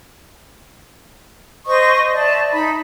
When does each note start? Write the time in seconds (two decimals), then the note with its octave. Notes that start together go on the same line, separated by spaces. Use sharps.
1.66 C5 D#5 C#6 D#6
2.12 D5 E5 A5
2.52 D#4 B5